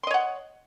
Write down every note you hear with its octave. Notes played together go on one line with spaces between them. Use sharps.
C#5 D#5 F#5 C6